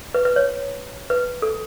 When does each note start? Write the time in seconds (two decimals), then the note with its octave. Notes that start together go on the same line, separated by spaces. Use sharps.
0.14 B4
0.25 B4
0.36 C#5
1.10 B4
1.42 A4